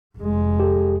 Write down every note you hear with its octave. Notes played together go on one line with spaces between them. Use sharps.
F1 G#3
G4 A4